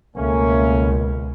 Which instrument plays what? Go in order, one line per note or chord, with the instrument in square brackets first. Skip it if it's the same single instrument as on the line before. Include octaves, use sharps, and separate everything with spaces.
[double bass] C#2 B2 [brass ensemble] A3 A#3 C#4